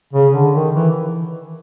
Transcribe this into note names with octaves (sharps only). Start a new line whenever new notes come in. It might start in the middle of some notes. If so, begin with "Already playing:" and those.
C#3
D3
D#3
E3